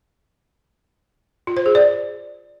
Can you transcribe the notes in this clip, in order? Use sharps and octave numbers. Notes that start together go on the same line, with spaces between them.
F4
C5
G#4
D5